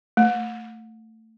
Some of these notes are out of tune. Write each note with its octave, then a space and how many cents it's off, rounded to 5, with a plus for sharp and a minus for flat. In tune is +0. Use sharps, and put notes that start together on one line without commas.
A3 +20